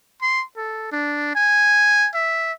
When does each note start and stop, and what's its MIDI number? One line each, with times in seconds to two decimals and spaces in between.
0.21 0.44 84
0.56 0.87 69
0.92 1.32 62
1.35 2.08 80
2.14 2.52 76